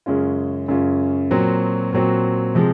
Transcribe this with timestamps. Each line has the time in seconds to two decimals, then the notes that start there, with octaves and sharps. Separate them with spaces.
0.06 F#2 C#3 G#3 C#4 F4
0.68 F#2 C#3 G#3 C#4 F4
1.31 A#2 F#3 C4 F#4
1.93 A#2 F#3 C4 F#4
2.55 C3 F3 G#3